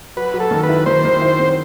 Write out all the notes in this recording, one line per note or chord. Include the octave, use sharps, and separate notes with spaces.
F#3 B4
F#3
A4
D#3
B4
E4
D#3 C5
D#3
E4
C4